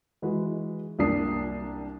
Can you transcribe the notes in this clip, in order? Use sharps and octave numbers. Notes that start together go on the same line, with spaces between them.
E3 G#3 F#4 B4
C2 A#3 D4 D#6 C7